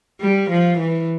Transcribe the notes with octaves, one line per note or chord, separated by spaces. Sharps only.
G3
F3
E3